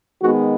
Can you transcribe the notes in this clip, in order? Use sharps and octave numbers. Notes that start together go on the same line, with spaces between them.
D#3 G#3 B3 F#4